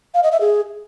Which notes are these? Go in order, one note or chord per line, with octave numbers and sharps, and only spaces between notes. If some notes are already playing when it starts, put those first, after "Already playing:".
F5
D#5
E5
G#4